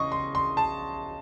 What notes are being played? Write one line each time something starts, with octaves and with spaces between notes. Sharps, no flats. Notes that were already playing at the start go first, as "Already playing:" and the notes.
Already playing: C#3 D#5 C#6
C6
C6
A5